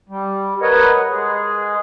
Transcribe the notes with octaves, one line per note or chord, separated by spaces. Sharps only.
G3
A#4 B4 C#5 D#5 F#5
G#3 G#4